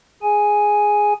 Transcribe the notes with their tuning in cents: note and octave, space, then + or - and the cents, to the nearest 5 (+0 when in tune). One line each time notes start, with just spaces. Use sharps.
G#4 +0 G#5 +0